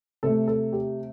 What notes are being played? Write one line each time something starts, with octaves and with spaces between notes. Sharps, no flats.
C3 A3 A4
A4
G4